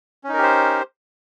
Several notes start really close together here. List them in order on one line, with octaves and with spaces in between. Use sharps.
C#4 D#4 A#4 G4 C5